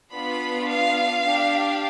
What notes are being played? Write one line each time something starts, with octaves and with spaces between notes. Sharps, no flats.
B3 D4 F4 B5
F5
D4 G4